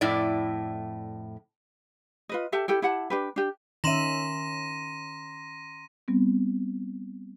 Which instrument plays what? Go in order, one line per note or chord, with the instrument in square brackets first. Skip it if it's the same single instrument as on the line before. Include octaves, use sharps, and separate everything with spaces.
[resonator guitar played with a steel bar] F2 A2 E4 D5
[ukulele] F4 B4 D#5
G4 A4 E5 A5
E4 G4 A4 G5
E4 G4 F#5 A5
D4 G4 B4
D4 G4
[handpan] D#3 C#4 E5 [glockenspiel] A#5 C6 E7 [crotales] A#6 D#7
[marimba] G3 B3 C4